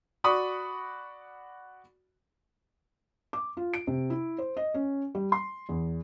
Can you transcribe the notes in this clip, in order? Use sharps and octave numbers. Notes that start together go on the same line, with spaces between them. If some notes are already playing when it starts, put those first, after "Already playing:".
F#4 D5 B5 C#6 D#6
D6
F4
D7
C3
E4
C5
D#5
C#4
G3
C6
E2